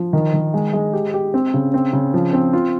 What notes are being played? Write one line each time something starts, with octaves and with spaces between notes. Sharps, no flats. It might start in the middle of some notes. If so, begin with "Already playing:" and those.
Already playing: F3
D#3
D#3
G#3
G#3
G4
G4
C4
C#3
C4
C#3
F3
C4
F4